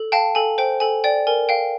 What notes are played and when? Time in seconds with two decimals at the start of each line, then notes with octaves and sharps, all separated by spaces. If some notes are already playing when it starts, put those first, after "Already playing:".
Already playing: A4
0.12 F5 G5 A5
0.35 A4 G#5
0.58 C5 G5
0.80 A4 G#5
1.04 D5 G5
1.27 A#4 G#5
1.49 F5 G5